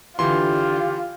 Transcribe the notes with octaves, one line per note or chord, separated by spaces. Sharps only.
D3 E3 F4 G4 C6